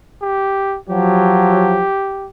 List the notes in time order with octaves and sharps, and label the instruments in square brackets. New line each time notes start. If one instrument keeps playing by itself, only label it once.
[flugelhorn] G4
[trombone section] F3 F#3 [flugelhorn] G4